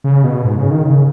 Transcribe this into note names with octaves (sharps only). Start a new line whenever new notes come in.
C#3
B2
G#2
C#3
D#3
C#3